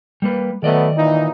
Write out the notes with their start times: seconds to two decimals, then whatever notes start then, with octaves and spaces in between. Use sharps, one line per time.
0.22 G3 A#3 B4
0.63 D#3 F#3 A3 B3 D5 D#5
0.96 A#2 E3 D#4